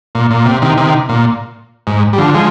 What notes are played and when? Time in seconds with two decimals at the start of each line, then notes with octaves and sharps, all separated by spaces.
0.15 A#2
0.31 A#2
0.46 C3
0.62 C3 D#3
0.78 C3 D#3
1.09 A#2
1.87 G#2
2.13 G3
2.18 D3 F3
2.34 F3 G#3